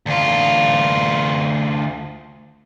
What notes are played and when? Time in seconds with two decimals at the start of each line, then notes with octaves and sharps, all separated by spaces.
0.06 D2 F4